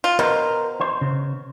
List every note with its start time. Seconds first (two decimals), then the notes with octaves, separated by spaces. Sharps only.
0.04 F4
0.19 B2 A#4 C5
0.81 C5
1.01 C#3